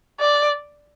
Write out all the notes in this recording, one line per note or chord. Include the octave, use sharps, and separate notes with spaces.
D5